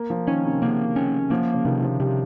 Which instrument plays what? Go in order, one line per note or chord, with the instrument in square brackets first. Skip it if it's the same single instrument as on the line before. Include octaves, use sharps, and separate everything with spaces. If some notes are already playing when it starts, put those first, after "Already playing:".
Already playing: [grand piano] A#3
F3
[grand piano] D#3 [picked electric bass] C#4
[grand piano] C3
[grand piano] C#3 [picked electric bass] A#3
[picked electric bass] C#4
[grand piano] F3 [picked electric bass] A#3
[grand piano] C#3
[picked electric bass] C3 [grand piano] D#3
[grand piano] F3
[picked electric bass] C3 [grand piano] G3